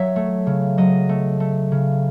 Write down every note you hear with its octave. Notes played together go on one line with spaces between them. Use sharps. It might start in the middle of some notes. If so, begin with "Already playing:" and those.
Already playing: F#3 C#5 E5
A3
C#3
F#3 D#5
A3
A3
C#3